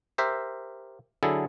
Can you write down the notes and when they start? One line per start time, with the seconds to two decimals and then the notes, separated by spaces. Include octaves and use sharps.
0.18 G4 A#4 C5 E5
1.23 D3 F#3 E4 G#4 A4